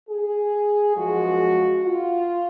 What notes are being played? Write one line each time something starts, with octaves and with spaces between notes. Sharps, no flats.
G#4
F#2 F3 G#3 F#4
F4